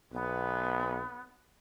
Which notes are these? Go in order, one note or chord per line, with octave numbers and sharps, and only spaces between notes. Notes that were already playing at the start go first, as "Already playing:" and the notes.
B1 B3